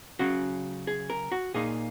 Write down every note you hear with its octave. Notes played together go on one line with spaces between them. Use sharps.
C#3 F#3 C#4 F#4
G#4
A#4
F#4
A#2 A#3 D#4 G#4